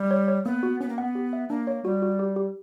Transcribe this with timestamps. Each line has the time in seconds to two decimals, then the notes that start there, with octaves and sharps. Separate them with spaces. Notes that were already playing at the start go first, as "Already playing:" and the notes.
Already playing: G3
0.11 C#5
0.28 C#5
0.45 A#3 B3
0.63 F#4
0.80 B3 C#4
0.89 A#3
0.98 B3 F#5
1.15 G4
1.33 E5
1.49 A#3 D4
1.67 C#5
1.84 G3 F#4
2.02 F#4
2.19 G4
2.36 G4